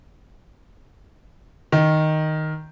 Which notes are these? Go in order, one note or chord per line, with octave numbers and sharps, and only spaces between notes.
D#3